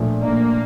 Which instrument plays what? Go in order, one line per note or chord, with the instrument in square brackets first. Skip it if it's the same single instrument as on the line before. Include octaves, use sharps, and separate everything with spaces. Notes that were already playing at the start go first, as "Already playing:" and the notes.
Already playing: [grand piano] A#2 F3 A3 D4
[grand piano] A#2 F3 A3 D4 [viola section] A#3